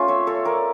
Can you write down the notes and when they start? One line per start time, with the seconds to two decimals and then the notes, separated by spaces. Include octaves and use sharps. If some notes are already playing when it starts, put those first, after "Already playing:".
Already playing: A3 C#4 F4
0.08 C#5 E5
0.27 A4 C#5
0.45 A#4 D5